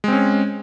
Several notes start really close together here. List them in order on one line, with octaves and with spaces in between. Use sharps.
G#3 C4 C#4